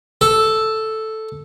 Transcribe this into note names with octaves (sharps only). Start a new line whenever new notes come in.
A4